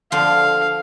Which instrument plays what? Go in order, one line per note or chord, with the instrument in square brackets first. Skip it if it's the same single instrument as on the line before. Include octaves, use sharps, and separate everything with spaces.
[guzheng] D3 F3 [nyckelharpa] F5